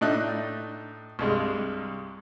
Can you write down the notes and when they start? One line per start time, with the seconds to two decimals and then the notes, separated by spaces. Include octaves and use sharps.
0.01 A2 D4 D#4 E5 F#6
1.19 C2 G2 G#3